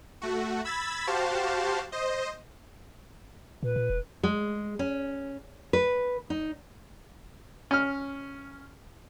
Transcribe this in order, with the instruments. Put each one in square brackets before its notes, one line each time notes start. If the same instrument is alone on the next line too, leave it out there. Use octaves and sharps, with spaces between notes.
[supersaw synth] A3 F#4
B5 E6 G#6 A6 B6
F#4 G4 C5 F5 A5
C5 D#5
[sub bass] A#2 [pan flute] B4
[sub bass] A#2
E1
[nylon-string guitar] G#3
C#4
B4
D#4
[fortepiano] C#4 F6